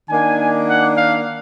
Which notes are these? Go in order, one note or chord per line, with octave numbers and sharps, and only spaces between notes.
D#3 A#3 D4 G#5
F#5
F5